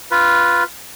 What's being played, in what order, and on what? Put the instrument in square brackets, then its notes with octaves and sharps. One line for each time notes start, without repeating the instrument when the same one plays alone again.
[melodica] F4 B4